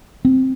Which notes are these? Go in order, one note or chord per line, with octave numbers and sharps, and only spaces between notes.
C4